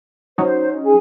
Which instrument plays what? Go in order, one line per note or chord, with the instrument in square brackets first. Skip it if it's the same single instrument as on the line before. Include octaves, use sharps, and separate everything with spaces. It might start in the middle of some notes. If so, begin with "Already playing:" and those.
[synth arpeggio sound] F#3 C#4 D#4 [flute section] C5
[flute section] G#4 G#5